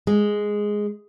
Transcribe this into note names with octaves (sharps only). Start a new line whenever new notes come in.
G#3